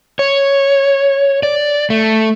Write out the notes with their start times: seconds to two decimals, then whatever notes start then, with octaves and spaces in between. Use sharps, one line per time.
0.19 C#5
1.43 D5
1.90 A3